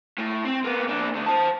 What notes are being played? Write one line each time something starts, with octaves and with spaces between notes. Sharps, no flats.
A2
C4
A#3 B3
A#3 D4
D2 A3
C5 A5